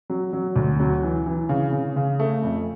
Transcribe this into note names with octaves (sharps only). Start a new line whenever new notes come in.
F#3
F#3
D2
F#3
E3
E3
C#3
C#3
C#3
A3
F2